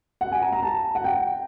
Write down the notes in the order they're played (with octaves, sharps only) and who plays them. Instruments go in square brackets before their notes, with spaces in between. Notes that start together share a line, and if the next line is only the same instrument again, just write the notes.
[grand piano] F#5
G#5
A#5
A#5
A5
F#5
G5